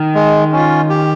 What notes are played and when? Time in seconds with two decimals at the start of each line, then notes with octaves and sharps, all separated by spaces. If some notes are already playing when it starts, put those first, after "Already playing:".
Already playing: D#3
0.15 G#3
0.52 C#4 F4
0.89 G4